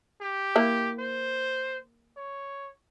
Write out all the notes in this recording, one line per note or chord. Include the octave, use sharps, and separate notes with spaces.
G4
A#3 E4
C5
C#5